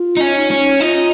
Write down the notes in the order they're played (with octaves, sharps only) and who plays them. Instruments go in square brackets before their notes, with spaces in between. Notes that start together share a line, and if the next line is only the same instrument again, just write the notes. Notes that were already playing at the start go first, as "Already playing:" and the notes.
Already playing: [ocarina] F4
[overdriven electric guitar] D#4
C#4
[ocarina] D#4
[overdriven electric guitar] C#4
[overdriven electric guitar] D#4 [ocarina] F4